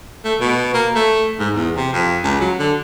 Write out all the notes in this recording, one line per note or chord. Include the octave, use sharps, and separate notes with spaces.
A3
B2
A#3
A3
G#2
E2
C3
F2
C#2
F#3
D3